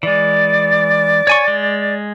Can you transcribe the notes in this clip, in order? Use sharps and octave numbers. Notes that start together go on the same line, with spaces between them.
E3 G#3 D5
C#5 G#5 C#6
G#3